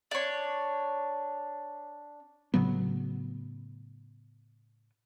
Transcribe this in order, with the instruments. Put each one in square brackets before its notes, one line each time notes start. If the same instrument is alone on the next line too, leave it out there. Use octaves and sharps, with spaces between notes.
[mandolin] D4 C#5
[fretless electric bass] A2 C#3 F#3 B3